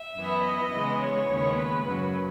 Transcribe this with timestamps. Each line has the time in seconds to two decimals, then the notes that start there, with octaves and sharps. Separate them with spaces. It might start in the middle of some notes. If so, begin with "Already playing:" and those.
Already playing: E5
0.17 F#2 E3 B3
0.44 D#5
0.73 C#3 E3 G#3 B3
1.01 C#5
1.30 D#2 C#3 G#3 B3
1.58 B4
1.86 F#2 C#3 F#3